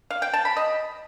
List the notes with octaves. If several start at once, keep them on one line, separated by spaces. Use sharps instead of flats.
F5
G5
A5
B5
D#5